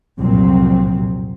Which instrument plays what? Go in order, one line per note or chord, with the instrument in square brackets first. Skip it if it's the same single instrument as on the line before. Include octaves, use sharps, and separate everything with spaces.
[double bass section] C2 F2 A#2 F#3 C4